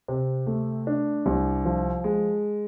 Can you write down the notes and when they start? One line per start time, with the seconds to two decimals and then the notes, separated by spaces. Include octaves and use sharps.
0.08 C3
0.46 A3
0.87 D4
1.26 C2
1.65 F3
2.04 G#3